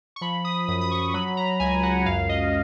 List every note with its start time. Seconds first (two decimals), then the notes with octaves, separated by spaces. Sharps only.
0.16 C#6
0.21 F3 B5
0.45 D#6
0.68 F#2 D#6
0.81 D#6
0.91 C#6
1.14 F#3 B5
1.37 A#5
1.60 C#2 G#5
1.83 F#5
2.06 F#2 F5
2.29 D#5